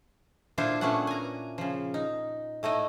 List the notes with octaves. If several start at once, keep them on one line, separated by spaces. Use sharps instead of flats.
A#2 D4 E4 F4 A4 C5
A#2 A3 B3 C#4 D4 F#5
G#5 A#5
C#3 F3
D#4
A2 A3 D#4 D#5